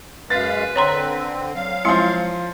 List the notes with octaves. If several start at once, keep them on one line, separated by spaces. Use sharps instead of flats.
F#2 G#3 B4 F5 A6
D3 C4 C#5 A#5 C6
F#3 F5
F3 G#3 C4 E4 C6